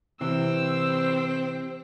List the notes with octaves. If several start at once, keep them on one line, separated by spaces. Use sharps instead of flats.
C3 E3 C4 E6